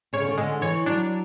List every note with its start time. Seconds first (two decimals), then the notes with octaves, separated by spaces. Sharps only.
0.13 C#3 C#5
0.20 D3
0.29 C#3
0.38 D3 G#3
0.61 E3 C#5
0.86 F#3 D4